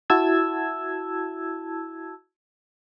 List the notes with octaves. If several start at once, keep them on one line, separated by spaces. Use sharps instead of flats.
E4 F#4 A5 E6 G#6